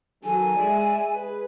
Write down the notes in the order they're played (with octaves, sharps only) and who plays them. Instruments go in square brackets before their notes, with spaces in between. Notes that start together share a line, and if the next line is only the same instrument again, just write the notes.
[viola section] D#3 F#3 A4 [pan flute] G#5
[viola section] G#3 D5 E5
G#4 B4